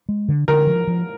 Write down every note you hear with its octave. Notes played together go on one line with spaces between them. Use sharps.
G#3
D3
D3 A#4
F3
F3